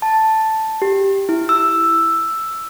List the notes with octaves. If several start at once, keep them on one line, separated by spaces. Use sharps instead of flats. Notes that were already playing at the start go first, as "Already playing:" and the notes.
A5
G4
E4
E6